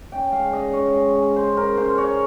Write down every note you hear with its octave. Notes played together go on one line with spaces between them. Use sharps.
C#4 G5
G#3 F5
C#3 D#5
C#3 C#5
G#3
G#3
C#3 C5
C#3 A#4
C#3 C5
C#3 C#5